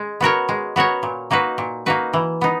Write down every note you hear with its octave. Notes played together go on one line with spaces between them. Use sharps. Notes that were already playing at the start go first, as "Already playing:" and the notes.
Already playing: G#3
B3 F#4 A#4 C#5
G#3
B3 F#4 A#4 C#5
A#2
A#3 D#4 F#4 B4
A#2
A#3 D#4 F#4 B4
E3
B3 D#4